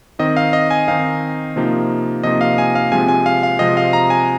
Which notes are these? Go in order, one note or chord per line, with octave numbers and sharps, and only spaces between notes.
D#3 C4 D#4 D#5
F5
D#5
G#5
D#3 C4 D#4 F5
C3 F3 A#3 D#4
C3 F3 A#3 D#4 D#5
F5
G#5
F5
C3 F3 G#3 C4 G#5
G#5
F5
F5
C3 F3 G#3 C4 D#5
F5
A#5
G#5